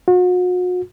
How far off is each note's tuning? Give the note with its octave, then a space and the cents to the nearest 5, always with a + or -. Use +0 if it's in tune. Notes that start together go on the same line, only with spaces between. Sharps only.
F#4 -40